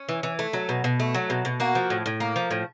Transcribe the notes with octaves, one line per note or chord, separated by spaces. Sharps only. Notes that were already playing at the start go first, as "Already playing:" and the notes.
Already playing: C#4
E3
E3
A3
F#3
B2
B2
A3
F#3
B2
B2
A#3 F#4
F3
A2
A2
A#3
F3
A2